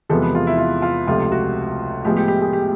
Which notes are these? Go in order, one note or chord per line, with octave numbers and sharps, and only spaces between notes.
E2 C3 F3 G#3 B3 A4
B4
F4
E4
F4
F4
C#2 C3 F3 A3 F4
F#4
A2 F3 G#3 B3 G4
G4
G4
G#4
G4